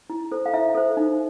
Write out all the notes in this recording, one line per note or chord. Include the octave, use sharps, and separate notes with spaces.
E4
A4 C5
F5
E4 E5
A4 C5
D#4